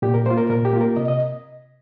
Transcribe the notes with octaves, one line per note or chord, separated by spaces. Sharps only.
A#2 G4
A#4
A#3 F4 C5
A#4
A#2 A#4
G4
A#3 F4
A#4
C3 D#5
D#5